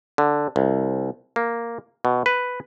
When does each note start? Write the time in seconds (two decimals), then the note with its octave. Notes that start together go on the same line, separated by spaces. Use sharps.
0.18 D3
0.56 C2
1.36 A#3
2.05 B2
2.26 B4